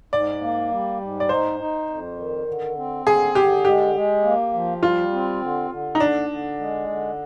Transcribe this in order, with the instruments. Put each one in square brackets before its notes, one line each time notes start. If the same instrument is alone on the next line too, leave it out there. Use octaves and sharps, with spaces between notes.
[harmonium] G#2 [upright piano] D5
[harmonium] A#3
G3
G#2
[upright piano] D5
[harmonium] D#4 [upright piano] C5
[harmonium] D#4
F2
D#3
D3
C4
[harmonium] D3 [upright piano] G#4
[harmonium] D3 [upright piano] G4
[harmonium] G#3 [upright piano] G4
[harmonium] G#3
A#3
F3
[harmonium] G3 [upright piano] F4
[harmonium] C4
D3
D3
[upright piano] D#4
[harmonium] D3 [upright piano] D4
[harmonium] D3
G#3
D3